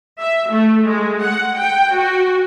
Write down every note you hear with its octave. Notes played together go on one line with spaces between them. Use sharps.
E5
A3
G#3
F#5
G5
F#4